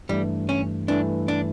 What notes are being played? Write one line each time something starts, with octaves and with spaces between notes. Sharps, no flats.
G2 E3 G3 A3
C#4
G2 E3 A3 D4
D4